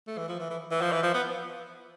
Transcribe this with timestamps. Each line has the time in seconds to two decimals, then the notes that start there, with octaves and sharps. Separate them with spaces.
0.07 A3
0.18 E3
0.28 F3
0.39 E3
0.50 E3
0.71 E3
0.81 F3
0.92 E3
1.03 F3
1.14 B3